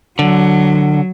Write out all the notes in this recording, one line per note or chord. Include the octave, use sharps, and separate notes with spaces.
D3 F#3